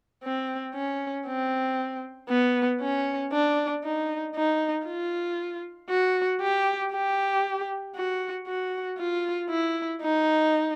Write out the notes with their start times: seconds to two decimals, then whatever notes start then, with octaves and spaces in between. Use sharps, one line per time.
0.24 C4
0.75 C#4
1.27 C4
2.29 B3
2.81 C#4
3.32 D4
3.84 D#4
4.35 D#4
4.86 F4
5.90 F#4
6.41 G4
6.92 G4
7.95 F#4
8.47 F#4
8.98 F4
9.50 E4
10.02 D#4